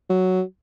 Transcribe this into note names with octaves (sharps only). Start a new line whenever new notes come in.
F#3